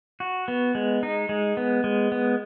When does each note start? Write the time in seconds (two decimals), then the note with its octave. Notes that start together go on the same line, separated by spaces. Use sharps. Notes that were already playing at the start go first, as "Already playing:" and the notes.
0.20 F#4
0.48 B3
0.75 G#3
1.03 D#4
1.29 G#3
1.57 B3
1.84 G#3
2.12 B3